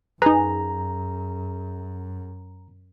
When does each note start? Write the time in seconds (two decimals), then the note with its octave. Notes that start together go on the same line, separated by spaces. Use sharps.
0.22 F#2 D#4 G#4 B4 A#5